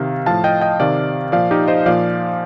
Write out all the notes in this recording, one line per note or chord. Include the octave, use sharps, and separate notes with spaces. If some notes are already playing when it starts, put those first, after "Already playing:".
Already playing: C3 D#3 F5
A2 F3 F5 A5
D#5 G5
D#5 G5
C3 D#3 D5 F5
A#2 F3 D5 F5
D#4 G4
C5 D#5
A#2 F3 D5 F5